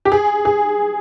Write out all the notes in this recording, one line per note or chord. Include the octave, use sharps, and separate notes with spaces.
G4
G#4
G#4